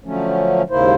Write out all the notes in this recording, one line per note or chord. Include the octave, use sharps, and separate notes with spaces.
D3 F3 F#3 A3 C#4
D#2 G#2 C#3 A#3 E4 C5